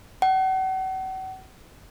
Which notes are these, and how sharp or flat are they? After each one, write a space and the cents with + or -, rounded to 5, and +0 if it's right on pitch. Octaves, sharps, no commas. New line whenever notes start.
F#5 +40